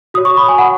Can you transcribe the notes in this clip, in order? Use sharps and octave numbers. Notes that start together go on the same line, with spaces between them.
F#4 C#5 D#6
C#6
B5
G#5
F#5